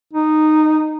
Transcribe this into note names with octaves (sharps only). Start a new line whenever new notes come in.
D#4